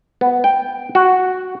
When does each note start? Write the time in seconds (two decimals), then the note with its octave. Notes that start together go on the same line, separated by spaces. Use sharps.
0.21 B3
0.44 G5
0.95 F#4